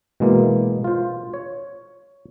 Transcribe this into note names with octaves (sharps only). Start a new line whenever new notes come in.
B2 E3 G#3 A#3
F4 C5
C#5